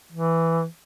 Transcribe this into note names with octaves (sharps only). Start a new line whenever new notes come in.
E3